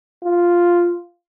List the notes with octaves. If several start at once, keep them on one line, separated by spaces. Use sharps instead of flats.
F4